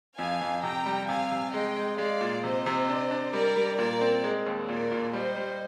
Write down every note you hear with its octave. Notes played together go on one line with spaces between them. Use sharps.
F2 F5 G#5
F2
C3 G5 A#5
G3
C3 F5 G#5
C3
G#3 D#5 G5
G#3
G#3 D5 F5
A#2
C3 C5 D#5
C3
D4
D4
G3 A#4 D5
G3
A#2 A#4 D5
C4
G#3
D#2
A#2 A#4 D5
A#2
G3 C5 D#5
G3